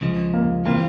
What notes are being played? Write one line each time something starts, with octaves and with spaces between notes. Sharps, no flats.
C#2 C#3 F3 G#3
A#3
E3 G3 A#3 C4 F4